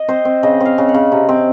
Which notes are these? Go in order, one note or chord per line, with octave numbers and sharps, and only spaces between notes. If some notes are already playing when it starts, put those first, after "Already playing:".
Already playing: D#5
C4 C5
C4
C#3 D#5
C4 F5
C#3
F#5
C#3
C3
C4